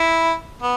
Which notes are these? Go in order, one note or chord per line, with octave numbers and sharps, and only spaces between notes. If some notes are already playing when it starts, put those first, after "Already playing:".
Already playing: E4
B3